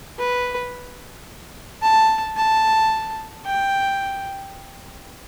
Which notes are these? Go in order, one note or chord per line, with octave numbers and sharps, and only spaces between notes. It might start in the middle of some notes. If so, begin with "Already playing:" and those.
B4
A5
A5
G5